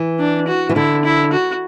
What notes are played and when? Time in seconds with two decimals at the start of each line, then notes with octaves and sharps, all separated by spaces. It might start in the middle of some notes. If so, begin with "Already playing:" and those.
Already playing: E3
0.19 D4
0.48 F#4
0.69 E3
0.76 D3 E4
1.04 E4
1.33 F#4